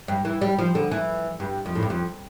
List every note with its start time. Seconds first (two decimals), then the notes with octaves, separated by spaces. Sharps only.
0.08 G2
0.25 E3
0.41 G3
0.58 F3
0.75 D3
0.91 E3
1.40 G2
1.66 F2
1.75 A2
1.83 G2
1.90 F2